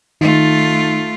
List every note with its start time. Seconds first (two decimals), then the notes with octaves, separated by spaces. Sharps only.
0.21 D#3 A3 D#4 F4